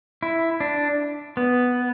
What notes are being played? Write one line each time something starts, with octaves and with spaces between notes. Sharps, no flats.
E4
D4
B3